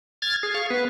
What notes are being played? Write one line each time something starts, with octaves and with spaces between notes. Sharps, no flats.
F6 G#6 A6
G#4
F5 C#6
B3 B4